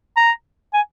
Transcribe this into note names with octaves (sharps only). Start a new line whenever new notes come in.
A#5
G#5